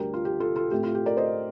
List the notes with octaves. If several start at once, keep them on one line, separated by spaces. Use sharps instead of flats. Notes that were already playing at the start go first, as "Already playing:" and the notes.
Already playing: D2 D3 G3 G4 A#4
F4
G4
F4 A4
F4 A4
A2 A3 C4 G4
F4
G4
A#4 D5
C5 D#5